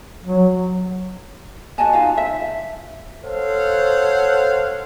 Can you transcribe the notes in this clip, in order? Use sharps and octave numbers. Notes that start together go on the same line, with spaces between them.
F#3
F#4 D#5 G#5 A5
D#4 F4 F5
E5
A4 C5 C#5 F5 F#5